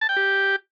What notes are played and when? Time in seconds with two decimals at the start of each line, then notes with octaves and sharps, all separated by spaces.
0.01 A5
0.09 G5
0.17 G4